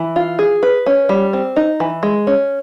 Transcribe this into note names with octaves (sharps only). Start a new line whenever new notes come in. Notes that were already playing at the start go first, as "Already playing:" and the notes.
Already playing: E3
F4
G#4
B4
C#4
G3
C4
D#4
E3
G#3
C#4